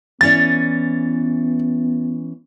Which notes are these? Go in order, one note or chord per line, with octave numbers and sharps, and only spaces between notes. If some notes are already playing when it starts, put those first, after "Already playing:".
E3 B3 C#4 D5 A6